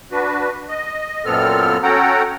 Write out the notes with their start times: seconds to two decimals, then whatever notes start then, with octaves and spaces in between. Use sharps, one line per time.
0.12 D4 F#4 B4
0.69 D#5
1.25 F#2 A#2 B3 C4 A4 F6
1.83 C#4 F#4 A4 F#5 G5 A#5